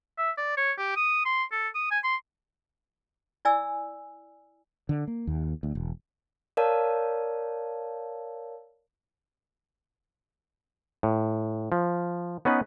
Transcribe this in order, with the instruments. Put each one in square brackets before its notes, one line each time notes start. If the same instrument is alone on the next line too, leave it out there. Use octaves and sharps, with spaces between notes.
[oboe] E5
D5
C#5
G4
D#6
C6
A4
D#6
G#5
C6
[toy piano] E4 D5 G#5 E6
[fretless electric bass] D3
A#3
D#2
D2
E1
[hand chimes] A#4 C#5 D5 F5 A5
[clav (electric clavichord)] A2
F3
B3 C#4 D#4 B4